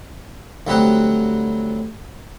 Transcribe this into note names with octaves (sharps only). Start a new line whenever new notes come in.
D2 F#3 G3 C4 G4 F#5